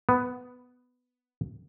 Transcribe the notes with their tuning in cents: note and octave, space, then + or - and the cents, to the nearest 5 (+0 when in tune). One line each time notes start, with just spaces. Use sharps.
B3 +10